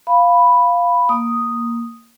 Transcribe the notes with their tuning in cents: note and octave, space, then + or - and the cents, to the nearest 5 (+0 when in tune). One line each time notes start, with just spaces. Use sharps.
F5 +0 B5 +0
A#3 +0 D#6 +0